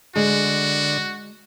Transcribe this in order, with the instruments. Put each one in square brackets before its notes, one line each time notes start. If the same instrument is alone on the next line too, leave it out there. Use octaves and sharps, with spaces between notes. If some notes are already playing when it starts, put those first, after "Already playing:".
[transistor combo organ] D3 [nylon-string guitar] G#3 [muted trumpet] F#4